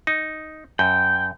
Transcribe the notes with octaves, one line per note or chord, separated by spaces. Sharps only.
D#4
F#2 G5